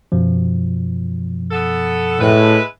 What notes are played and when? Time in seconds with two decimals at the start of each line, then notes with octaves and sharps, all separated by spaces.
0.12 F#2 B2 F3
1.51 B3 A4
2.21 A2 G#3 E4 B4